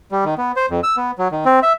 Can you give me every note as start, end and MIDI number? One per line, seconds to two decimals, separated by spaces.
0.12 0.25 55
0.25 0.34 51
0.38 0.52 59
0.56 0.66 72
0.70 0.80 41
0.83 0.96 88
0.97 1.11 59
1.18 1.28 54
1.32 1.45 51
1.45 1.60 60
1.63 1.73 76